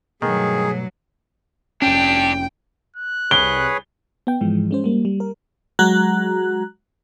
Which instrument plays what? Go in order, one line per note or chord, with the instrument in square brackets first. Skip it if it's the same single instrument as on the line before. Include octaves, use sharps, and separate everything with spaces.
[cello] G2 F#3 [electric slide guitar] B2 A3 B3 [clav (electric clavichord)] D#3 [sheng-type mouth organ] G#4
[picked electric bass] F1 C#4 [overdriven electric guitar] D4 G4 [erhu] G5
[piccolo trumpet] F#6
[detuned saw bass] C2 [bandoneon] G#4 B4 C#5 [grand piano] G7
[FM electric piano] B3 G5
G#2 E3 F3 G#3
G#3 C#4 C5
G3 A#3
G3
A#4
F#3 G#3 F#4 A#5 F#6